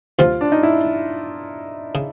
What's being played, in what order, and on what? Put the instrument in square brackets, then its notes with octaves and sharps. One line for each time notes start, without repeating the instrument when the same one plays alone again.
[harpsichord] D2 C3 F3 [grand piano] F4
[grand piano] D4
D#4
E4
[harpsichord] C#3